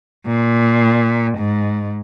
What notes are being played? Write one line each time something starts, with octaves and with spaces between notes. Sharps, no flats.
A#2
G#2